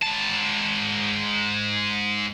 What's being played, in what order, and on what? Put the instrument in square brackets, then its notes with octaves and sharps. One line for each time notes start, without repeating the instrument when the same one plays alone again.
[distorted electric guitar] G#2 A5